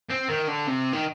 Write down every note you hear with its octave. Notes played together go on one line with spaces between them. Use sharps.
C4
D#3
D3
C3
D#3